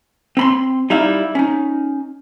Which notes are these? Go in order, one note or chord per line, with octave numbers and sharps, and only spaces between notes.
C4 B5 C6
G3 D#4 E4 F5
C#4 D#4